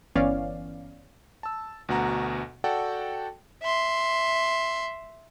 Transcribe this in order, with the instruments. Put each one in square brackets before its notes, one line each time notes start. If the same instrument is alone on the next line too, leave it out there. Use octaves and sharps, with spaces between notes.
[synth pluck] G1 E3 B3 C#4 D5 F5
[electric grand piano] A5 E6
D2 B2 F#4 F#5 A#5
F#4 A4 D5 F#5 G5 A5
[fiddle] E5 C6